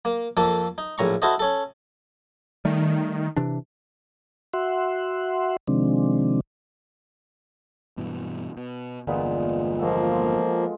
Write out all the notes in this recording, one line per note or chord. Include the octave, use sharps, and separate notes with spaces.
A#3
F2 A#3 A4 A5
D#4
A#1 A2 A#5 C#6
E4 F#4 A4 C5 D#5
C#4 A4
D#3 G3 A3
C3 E3 D4
F#4 E5 F#5 C6
C3 D#3 F3 G#3 C4 D4
G2 B2 E3
B2
G1 E2 A#2 D3 G#3 B3
F3 G#3 A#3 F#4 A4
F4